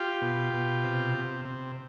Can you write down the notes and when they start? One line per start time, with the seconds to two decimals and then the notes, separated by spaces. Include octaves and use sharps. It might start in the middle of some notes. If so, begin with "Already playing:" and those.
Already playing: F4 G4
0.22 B2
0.53 B2
0.84 C3
1.14 C3
1.45 C3